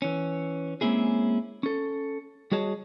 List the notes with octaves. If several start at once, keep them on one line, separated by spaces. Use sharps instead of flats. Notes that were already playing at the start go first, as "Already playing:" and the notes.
E3 C#4
G#3 A#3 C4 C#4 E4 G#4
C#4 A4
G3 F#4 G#4 C#5 D#5 A5